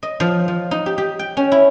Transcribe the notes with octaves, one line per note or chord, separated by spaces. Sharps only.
D#5
F3
F3
D#4
G4
G4
G5
C#4
E4